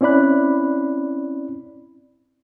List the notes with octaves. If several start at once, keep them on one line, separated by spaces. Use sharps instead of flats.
C4 C#4 E4 D5 B5 F#6